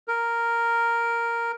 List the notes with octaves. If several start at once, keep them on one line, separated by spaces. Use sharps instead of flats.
A#4